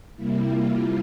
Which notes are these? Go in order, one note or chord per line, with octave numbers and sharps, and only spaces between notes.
C3 G3 A#3 E4
F4